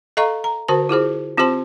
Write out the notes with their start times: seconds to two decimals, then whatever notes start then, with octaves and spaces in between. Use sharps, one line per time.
0.17 A4 D#5 F5 A#5 C#6
0.44 A#5
0.68 D3 F#4 A#4 C5 A5
0.89 E4 F4 G#4 C5
1.37 C4 F4 G4 C5 A5 C6